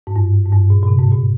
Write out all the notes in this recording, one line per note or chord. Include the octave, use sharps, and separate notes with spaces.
G#2
G2
G#2
G2
A#2
A#2
C3
G#2
A#2